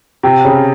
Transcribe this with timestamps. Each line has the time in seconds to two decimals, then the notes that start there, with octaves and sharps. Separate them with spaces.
0.23 C3
0.45 C#3